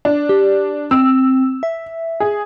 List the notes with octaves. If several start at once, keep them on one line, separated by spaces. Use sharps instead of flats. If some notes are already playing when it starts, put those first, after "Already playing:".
D4
G4
C4 E6
E5
G#4